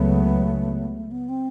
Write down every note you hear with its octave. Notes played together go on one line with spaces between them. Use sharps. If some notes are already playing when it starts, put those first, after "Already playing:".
Already playing: C#2 C#3 F#3 A3 B3
B3
C4